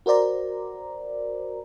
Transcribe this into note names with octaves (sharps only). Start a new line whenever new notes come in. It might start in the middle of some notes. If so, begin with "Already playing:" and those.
F#4 A#4 C5 D5 A#5